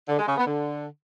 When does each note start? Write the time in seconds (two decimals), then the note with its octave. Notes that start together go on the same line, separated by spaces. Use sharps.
0.08 D3
0.18 G#3
0.27 C#3
0.37 B3
0.47 D3